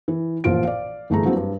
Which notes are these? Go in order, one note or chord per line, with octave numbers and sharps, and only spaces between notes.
E3
A1 A#2 F3 F4 D7
D5 F5
G1 E3 A3 G#4 A#5
F3 F#3 A#3 C4 D4 E4
G2